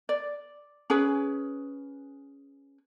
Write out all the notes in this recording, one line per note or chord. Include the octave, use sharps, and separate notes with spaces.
D5
C#4 G#4 B4